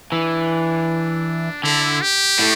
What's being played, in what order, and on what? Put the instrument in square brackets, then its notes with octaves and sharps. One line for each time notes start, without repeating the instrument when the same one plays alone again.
[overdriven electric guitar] E3 [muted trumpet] D4
[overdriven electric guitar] D3 [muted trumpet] E4
[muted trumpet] G4
[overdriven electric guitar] A2